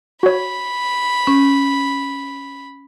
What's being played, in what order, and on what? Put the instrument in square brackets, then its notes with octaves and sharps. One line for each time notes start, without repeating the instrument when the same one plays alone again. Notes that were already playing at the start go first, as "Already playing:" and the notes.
[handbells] F#4 C#5 [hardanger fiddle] B5
[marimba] C#4